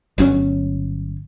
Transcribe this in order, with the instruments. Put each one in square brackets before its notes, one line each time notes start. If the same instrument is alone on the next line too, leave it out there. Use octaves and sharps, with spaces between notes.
[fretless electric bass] G1 F#3 C4 C#4